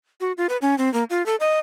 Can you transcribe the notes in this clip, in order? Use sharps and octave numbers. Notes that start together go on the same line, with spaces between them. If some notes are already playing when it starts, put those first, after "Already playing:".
F#4
F4
B4
C#4
C4
A#3
F4
A4
D#5